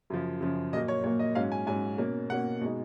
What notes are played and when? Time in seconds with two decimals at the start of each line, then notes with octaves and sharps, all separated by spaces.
0.10 F#2 C#3 F3
0.40 F#2 C#3 F3
0.73 A#2 F#3 A#3 D#5
0.88 C#5
1.04 A#2 F#3 A#3 C#5
1.19 D#5
1.35 G#2 F#3 C#4 F5
1.52 G#5
1.67 G#2 F#3 C#4 G#5
1.98 B2 A#3 C#4
2.30 B2 A#3 C#4 F#5
2.61 B2 G#3 D#4